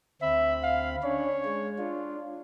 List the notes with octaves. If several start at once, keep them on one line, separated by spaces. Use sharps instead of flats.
D2 C4 E5 B5
F5
C#4 D4 C#5
G#3
D4 F4